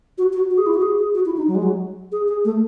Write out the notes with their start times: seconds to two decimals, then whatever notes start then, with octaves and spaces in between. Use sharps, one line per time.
0.18 F#4
0.33 F#4
0.50 F#4
0.58 G#4
0.66 E4
0.74 F#4
0.82 G#4
0.98 G#4
1.14 F#4
1.26 E4
1.37 D#4
1.48 F#3
1.55 G#3
1.63 F#3
2.12 G#4
2.28 G#4
2.45 A3